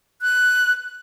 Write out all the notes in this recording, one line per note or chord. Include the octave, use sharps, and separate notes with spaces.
F#6